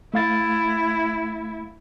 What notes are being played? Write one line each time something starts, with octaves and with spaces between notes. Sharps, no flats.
A3 E4 F5 A6